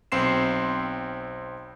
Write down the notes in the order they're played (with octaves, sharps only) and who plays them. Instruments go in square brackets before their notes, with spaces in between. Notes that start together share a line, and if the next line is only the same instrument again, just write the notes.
[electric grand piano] B1 C4 C6 C7 E7